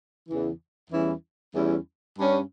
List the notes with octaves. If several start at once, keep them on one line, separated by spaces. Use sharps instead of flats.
E2 C#3 E3
E2 E3 G3 C#4 E4
E2 E3 G3 C#4 E4
G2 G3 C#4